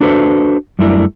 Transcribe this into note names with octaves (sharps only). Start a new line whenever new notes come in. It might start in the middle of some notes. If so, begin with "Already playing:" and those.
D4 F#4 A4 B4 C5
F#2 G3 A3 D4 E4 A#4